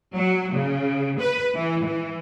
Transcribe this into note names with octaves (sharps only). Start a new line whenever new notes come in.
F#3
C#3
B4
E3
E3